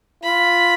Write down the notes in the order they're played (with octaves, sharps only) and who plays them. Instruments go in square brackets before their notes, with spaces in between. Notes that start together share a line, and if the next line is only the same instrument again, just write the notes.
[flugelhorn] F4 [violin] B5